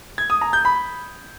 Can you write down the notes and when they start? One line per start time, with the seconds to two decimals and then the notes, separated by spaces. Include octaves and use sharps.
0.18 G#6
0.30 D#6
0.41 A#5
0.53 G6
0.65 B5